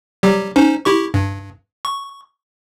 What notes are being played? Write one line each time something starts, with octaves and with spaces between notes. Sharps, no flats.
F#3 G3 G4
C#4 D#4 C5
E4 G4 C#6
G2
C#6